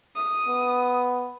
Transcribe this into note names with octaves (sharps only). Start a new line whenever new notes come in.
D#6
B3